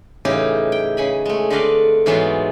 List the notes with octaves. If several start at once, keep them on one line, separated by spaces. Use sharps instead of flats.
A2 C#3 E3 D#4 E4 G4
G5
C#3 G#5 B5
G#3 A3
D3 C4 B4 D5 D#5 F5
G#2 E3 F#3 G#3 B3 F4